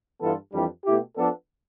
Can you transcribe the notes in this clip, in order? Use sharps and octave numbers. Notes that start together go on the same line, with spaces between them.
G2 E3 B3 F4 A4
F2 E3 G3 D4 G4
B2 A3 E4 G4
F3 B3 D4 A4